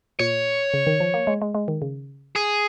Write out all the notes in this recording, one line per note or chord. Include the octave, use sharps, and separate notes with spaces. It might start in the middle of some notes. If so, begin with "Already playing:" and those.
A#2 C#5
C#3
D#3
F3
A#3
G#3
G#3
G#3
D#3
C#3
G#4